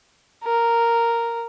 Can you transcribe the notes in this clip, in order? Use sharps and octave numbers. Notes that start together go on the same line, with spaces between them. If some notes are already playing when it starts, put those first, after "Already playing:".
A#4